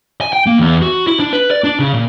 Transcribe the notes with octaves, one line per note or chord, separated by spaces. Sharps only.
G#5
G5
A#3
E2
F#4
E4
D4
B4
D5
D4
C#3
A#2